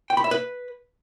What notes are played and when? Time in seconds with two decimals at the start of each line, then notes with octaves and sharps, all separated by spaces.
0.10 G5
0.17 B5
0.24 E5
0.31 B4